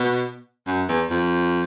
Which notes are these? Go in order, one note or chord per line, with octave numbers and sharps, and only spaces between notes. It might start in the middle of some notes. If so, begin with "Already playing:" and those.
Already playing: B2
F#2
E2
F2